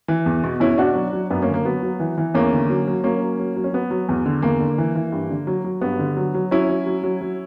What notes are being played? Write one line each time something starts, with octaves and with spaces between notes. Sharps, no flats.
E3
E2
B2
E2 C#4 E4
B2 D4 F#4
F#3
F#3
F#2 B3 D4
A#3 C#4
D3
A#3
F#3 B3
F#3
E3
E3
E2 A#3 C#4
D3
F#3
F#3
F#3 A#3 C#4
F#3
F#3
F#3
C#4
F#3 B3
F#3
E2
D3
E2 A#3
D3
E3
E3
G2
D3
F#3
F#3
G2 B3
D3
F#3
F#3
F#3 C#4 E4
F#3
F#3
F#3
F#3